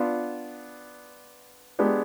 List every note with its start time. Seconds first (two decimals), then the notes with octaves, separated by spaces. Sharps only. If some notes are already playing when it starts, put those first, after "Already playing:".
Already playing: B3 D4 F4
1.79 G#3 B3 D4 G4